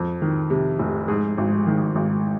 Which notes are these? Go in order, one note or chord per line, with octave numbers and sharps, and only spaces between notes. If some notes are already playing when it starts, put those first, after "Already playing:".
Already playing: F2
D#3
C3
F1
G#2 G#4
G#1
D#3
G#1